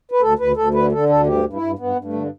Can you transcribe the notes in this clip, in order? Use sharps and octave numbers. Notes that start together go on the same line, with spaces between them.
B4
D2 A4
D2 B4
D2 A4
D3 B4
D3 A4
D2 A4
G2 G4
G2
E4
G2
G2 B3
G2
A3
D3